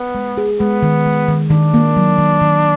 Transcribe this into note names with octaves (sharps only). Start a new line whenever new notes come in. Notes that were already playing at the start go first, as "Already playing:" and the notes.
Already playing: B3
G#3
G#4
G#3 B3
D#3
G#3
D#3
D#3 D4
A#3
F#3
D#3
D#3